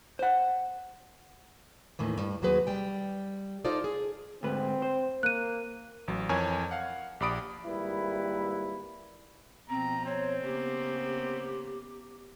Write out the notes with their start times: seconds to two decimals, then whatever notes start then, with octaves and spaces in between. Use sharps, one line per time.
0.19 C5 F#5
1.99 D#2 A2 D#3 E3
2.18 G2
2.42 D#2 F#3 C4 G#4 B4
2.67 G3 G5
3.65 D#4 F4 A4 C5 D5
3.84 G#4
4.43 D2 G#2 C4 B4
4.82 C5
5.23 A#3 F#6 D#7
6.08 A1 F#3
6.29 F2 E3 A#4 C#5 G#5 G#6
6.71 F5 F#5
7.20 A#1 G4 D5 B5 D#6 D7
7.66 G#1 G3 A#3 E4 B4
9.70 B2 F3 C4 A#5
10.06 C4 C#5
10.44 C#3 A#3 B3 G4